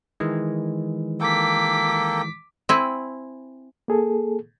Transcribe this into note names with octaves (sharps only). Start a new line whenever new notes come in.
D#3 E3 G#3
A#3 A4 G5 D6 B6
C4 E4 G#5
A#3 G#4 A4